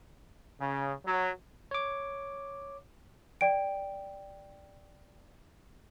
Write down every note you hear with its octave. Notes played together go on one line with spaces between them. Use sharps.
C#3
F#3
C#5 D6
D5 G5 D7